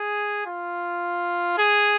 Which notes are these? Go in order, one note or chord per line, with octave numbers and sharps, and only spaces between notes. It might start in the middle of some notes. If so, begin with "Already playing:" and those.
Already playing: G#4
F4
G#4